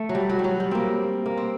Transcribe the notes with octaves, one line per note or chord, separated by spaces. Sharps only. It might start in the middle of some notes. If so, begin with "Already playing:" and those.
Already playing: A3
F#3
G3
F#3
G3
F#3
G3
A#3 C4
A#3
C4